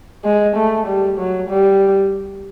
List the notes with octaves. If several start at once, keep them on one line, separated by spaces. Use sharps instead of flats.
G#3
A3
G3
F#3
G3